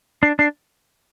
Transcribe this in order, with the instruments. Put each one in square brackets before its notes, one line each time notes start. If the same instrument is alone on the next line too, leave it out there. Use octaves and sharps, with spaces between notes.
[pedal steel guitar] D4 [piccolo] C7
[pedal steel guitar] D4 [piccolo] C7